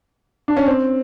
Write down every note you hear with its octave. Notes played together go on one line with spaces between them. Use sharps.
D4
C#4
C4